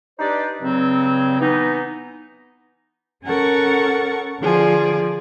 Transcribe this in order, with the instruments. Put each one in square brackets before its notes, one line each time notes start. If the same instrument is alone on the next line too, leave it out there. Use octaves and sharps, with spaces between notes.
[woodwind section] D4 D#4 G4 B4 C5 D5
G2 C#3 F#3 C4
E3 B3 D#4
[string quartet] C#4 A4 A#4 F#5 C#6
D3 F3 G#4 D5